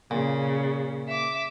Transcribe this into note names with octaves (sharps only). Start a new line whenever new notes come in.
A#2 C#3
E5 D6